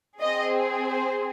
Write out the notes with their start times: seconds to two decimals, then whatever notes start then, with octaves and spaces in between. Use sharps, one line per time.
0.21 C4 G#4 D#5
0.90 C5